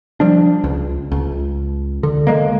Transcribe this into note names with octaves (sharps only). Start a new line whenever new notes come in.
F3 G3 D4
C#2
C#2
D3
D3 F3 G#3 A#3